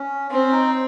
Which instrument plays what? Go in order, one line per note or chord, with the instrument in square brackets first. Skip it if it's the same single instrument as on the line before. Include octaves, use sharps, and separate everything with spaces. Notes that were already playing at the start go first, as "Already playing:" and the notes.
Already playing: [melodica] C#4
[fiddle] C4 [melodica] C#4
[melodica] D#4